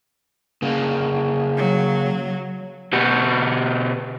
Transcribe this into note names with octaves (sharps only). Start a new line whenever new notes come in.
C#3 A#3
F#3
B2 F#4 G4